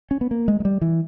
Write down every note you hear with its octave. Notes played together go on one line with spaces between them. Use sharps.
C#4
B3
A#3
G#3
G#3
G3
E3